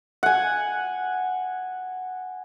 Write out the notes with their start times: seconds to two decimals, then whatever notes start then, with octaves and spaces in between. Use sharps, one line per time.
0.23 F#5 G#5